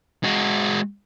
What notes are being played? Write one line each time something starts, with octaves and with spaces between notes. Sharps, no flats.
G#3 F#4